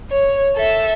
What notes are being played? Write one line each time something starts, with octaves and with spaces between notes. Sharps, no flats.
C#5
A4 E5